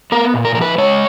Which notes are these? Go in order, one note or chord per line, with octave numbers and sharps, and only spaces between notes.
B3 A#4
A#2
A#4
F3 A#4
B4
G#3 C#5